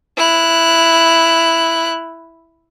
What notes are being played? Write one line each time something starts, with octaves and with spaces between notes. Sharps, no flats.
E4 F#6